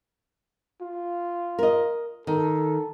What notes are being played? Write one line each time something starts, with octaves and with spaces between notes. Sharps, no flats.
F4
A#4 D#5
D#3 A4